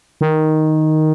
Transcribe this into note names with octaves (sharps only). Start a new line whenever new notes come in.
D#3